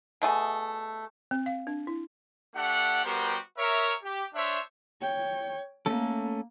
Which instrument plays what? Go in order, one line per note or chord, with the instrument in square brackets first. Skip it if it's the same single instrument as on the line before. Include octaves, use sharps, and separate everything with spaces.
[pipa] B2 A3 G#4
[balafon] C4
F5
D4
E4
[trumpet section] A3 D4 G4 F#5
G3 B3 F#4 G4 A#4 C5
A#4 C#5 E5
G4
D4 C5 C#5 E5
[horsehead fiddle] C#5 G5
[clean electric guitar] A3 C#4 A4 [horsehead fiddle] A#3